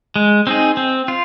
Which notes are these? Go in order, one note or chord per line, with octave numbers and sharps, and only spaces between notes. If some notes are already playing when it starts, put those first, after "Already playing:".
G#3
C4 D#4 G#4
C4
F4